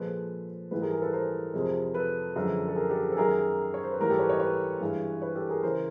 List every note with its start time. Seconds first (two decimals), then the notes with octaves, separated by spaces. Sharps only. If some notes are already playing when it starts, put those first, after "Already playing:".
Already playing: A#2 F3 G#3 A4 B4
0.71 G#2 E3 G3 A4 B4
0.81 G#4 A#4
0.92 G#4 A#4
1.02 A4 B4
1.13 A#4 C5
1.54 F2 C3 F3 G#3
1.94 A4 B4
2.36 F#2 D3 F3 G#3
2.68 A4
2.76 G#4 A#4
2.89 G4 A4
3.12 A4
3.17 F#2 D#3 G#3 G#4 A#4
3.74 C#5
3.83 C5
3.92 B4
3.99 G#2 E3 G3 A#4
4.10 G4 A4
4.19 B4 C#5
4.30 C#5 D#5
4.40 B4 C#5
4.81 G2 E3 G#3
5.22 B4 C#5
5.35 G4 A4
5.50 G#4 A#4
5.63 C#3 E3 A#4 C5